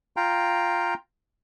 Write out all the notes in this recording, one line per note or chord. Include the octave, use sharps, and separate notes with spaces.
F4 F5 G5 A#5